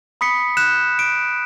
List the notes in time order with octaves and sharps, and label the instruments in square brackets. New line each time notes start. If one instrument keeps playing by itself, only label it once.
[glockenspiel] B5 D#6 B6 C#7
F#6 G6 E7
D7